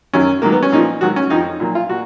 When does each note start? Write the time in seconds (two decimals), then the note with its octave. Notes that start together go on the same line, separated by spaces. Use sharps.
0.13 F#2 D#3 F#3 C#4
0.42 G#2 D#3 F#3 A#3
0.52 B3
0.63 C#4
0.72 A#2 F3 D#4
1.01 G#2 D#3 F#3 F#4
1.16 C#4
1.30 F2 F3 D#4
1.60 A#2 F#3
1.75 F4
1.89 A#2 F#4